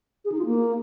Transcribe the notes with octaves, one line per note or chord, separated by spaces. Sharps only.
G#4
D#4
F4
A#3